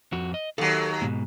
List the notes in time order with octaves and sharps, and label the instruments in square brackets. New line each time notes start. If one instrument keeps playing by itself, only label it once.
[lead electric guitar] F2 F#4
D#5
[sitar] D#2 F#3 [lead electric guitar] A4
[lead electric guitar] G#2 B2